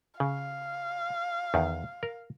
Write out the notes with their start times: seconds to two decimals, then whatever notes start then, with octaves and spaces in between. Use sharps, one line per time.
0.20 C#3 F5
1.54 E2 D#3
2.03 A#4